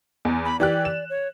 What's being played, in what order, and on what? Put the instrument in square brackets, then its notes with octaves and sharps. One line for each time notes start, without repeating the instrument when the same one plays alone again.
[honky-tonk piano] E2
[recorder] B5
[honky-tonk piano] E3 G4 F#6 [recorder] D5
[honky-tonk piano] E7
[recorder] C#5